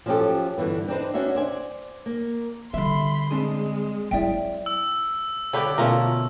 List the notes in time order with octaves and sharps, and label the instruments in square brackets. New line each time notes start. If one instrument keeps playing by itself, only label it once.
[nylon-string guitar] F3 F#3 C#4 D#4 G4 A4
G2 D3 E3 B3
C4 D4 D#4 B4 C5
C#4 D4 F#4 E5
C5 D5 G#5
A#3
[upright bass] D3 G3 [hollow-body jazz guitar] E5 [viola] B5 C6
[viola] G#3 [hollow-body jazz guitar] C4 D4 G#4
[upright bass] F#3 E4 [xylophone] D5 E5 G5
[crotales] E6
[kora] D3 D5 [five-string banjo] G4 B4 C#5
[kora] B2 A3 [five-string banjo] C#4 F4 A#4